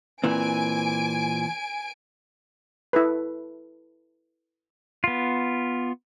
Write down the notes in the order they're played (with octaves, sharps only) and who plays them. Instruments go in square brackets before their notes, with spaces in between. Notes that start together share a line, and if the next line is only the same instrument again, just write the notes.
[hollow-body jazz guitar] A#2 E3 C4 [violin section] G#5 D7
[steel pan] E4 A4 B4
[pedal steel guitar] B3 F4